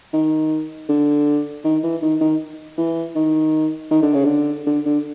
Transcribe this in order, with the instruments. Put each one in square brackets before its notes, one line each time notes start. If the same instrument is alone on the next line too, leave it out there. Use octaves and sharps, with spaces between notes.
[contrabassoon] D#3
D3
D#3
E3
D#3
D#3
E3
D#3
D#3
D3
C#3
D3
D3
D3